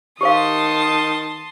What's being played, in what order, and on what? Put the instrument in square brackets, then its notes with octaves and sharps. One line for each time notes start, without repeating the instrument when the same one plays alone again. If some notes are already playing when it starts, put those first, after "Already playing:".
[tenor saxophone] D#3 [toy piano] G4 C5 F5 [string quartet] A5 C6 D#6